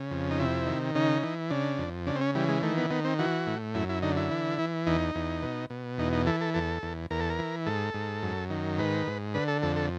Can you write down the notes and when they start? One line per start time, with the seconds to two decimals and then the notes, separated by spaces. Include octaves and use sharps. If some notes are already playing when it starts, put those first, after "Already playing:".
Already playing: C#3
0.11 F2
0.31 D#4
0.39 C3 E4
0.67 D#3
0.95 C#3 D#4
1.23 E3
1.50 C#3 D4
1.78 F2
2.07 C#3 D4
2.15 C4
2.21 C#4
2.35 E3 G3
2.49 G#3
2.63 D#3 A3
2.77 B3
2.90 D#3 B3
3.04 C4
3.19 E3 F#4
3.47 A2
3.75 F#2 E4
3.89 E4
4.02 D3 D#4
4.17 E4
4.31 E3
4.58 E3
4.87 E2 D#4
5.15 E2
5.42 B2
5.70 B2
5.98 E2 D#4
6.12 D#4
6.26 E3 A4
6.41 A4
6.54 E2 A4
6.83 E2
7.10 E2 A#4
7.20 A4
7.30 A#4
7.39 E3
7.66 G#2 A4
7.94 G#2
8.22 F#2
8.50 D#3
8.78 G#2 B4
9.07 G#2
9.34 D3 B4
9.48 A4
9.62 F2 A4
9.76 A4